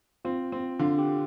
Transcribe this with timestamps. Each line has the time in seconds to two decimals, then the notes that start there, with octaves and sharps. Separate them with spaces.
0.25 C4 F4
0.52 C4
0.79 D3 F4
0.98 G4